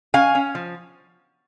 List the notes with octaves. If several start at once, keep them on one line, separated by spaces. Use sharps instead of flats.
C#4 F5 G#5
C#4
F3